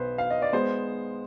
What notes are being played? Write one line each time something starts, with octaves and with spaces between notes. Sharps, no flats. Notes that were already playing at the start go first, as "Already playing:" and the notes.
Already playing: B1 B2 B3 B4 C5
F5
D#5
D5
G#3 B3 C5